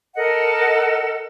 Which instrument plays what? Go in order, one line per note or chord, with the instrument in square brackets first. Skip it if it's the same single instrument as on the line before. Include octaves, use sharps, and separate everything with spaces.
[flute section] A4 A#4 D#5 F#5